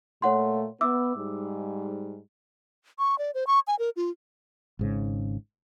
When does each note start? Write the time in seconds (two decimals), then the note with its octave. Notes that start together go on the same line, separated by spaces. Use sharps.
0.22 A#2 A3 C#5 F#5 C6
0.81 B3 E5 D6 E6
1.16 G#2 G3
2.99 C#6
3.18 D5
3.34 C5
3.47 C#6
3.67 G#5
3.79 A#4
3.96 F4
4.79 G#1 G#2 C#3